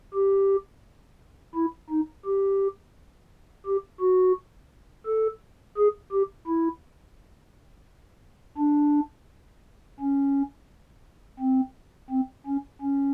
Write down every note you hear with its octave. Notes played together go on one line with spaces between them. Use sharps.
G4
E4
D#4
G4
G4
F#4
A4
G#4
G4
E4
D4
C#4
C4
C4
C#4
C#4